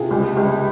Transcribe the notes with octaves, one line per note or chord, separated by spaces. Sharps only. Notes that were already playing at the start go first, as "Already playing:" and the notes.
Already playing: C3 F4 G#4
C#2 G4
C#2 G4